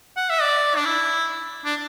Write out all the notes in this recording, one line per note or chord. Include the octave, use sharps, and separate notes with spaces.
F#5
E5
D5
D4
E4
D4